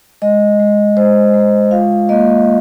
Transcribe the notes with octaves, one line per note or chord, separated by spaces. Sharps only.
G#3 D#5
G#3
G#3 C5
G#3
F4 F5
A#3 D#5